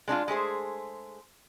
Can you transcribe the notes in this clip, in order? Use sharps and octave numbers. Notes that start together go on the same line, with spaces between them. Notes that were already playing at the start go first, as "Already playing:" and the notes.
G#3 D4 D#4 F4
G#3 A3 G#4 C5